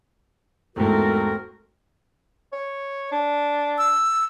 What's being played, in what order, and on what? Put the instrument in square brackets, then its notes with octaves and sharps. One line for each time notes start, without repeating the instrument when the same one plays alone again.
[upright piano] E2 G#2 [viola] A3 [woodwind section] C4 F#4 A#4
[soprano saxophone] C#5
D4
[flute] E6